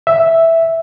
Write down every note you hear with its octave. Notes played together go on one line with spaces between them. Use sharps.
E5